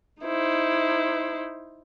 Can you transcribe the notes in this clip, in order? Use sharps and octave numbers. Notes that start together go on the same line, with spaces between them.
D#4 E4 C5